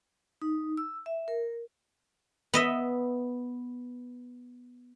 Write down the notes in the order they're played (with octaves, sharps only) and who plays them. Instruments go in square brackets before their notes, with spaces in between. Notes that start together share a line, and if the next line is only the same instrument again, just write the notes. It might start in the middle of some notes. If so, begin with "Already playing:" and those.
[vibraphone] D#4
E6
E5
A#4
[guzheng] B3 D#5 E5